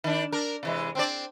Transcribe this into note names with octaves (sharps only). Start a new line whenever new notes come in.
D#3 D4
D4 A#4
C3 E3 G#3
C4 D4 D5